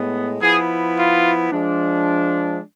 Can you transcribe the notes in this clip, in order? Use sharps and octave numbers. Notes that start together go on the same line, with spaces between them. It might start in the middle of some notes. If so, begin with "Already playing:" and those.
Already playing: A2 G#3 B3
F3 B3 E4 G#4
F4
F3 G#3 D4